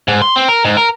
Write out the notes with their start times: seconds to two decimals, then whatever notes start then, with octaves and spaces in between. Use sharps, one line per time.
0.08 G#2
0.22 C6
0.36 C4
0.48 A#4
0.65 G#2
0.77 A#4